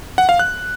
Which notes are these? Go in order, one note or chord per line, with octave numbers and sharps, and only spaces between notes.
F#5
F5
F#6